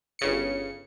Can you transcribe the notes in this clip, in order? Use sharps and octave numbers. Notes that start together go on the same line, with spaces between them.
G1 C#3 C#7